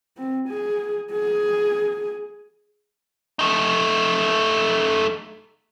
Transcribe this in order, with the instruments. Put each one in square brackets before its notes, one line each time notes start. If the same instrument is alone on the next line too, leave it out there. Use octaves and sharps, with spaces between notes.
[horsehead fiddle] C4
G#4
G#4
[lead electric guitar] A3 D#4